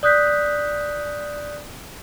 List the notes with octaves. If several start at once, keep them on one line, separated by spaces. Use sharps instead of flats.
D5 D#6 F#6 G6 B6